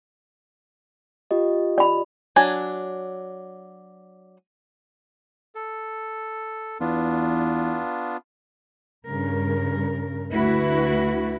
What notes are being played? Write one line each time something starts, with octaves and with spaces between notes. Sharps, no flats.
F4 G4 D#5
D5 B5
F#3 D4 G#5
A4
E2 B3 D4 F4
G2 C#3 A#4
D2 E4 F#4 B4